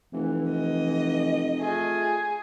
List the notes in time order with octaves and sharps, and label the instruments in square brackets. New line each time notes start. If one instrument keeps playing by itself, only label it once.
[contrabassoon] F1 [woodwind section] E3
[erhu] D#5
[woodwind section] A3 F4 [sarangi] G#4